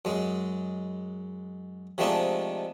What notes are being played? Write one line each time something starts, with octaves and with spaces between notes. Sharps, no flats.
F#2 G#3
C3 F3 G#3 A3 D4 D#4